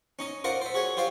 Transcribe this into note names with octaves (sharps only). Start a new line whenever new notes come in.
C#4 D#4 D#5
F4 A#4 C5 D5 D#5 F#5
C5 E5
F#4 G#4 C#5
F4 G4 C5 D5 F5